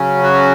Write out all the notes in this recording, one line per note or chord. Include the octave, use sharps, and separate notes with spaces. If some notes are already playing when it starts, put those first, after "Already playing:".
Already playing: C#3 F#3 C#4
F#4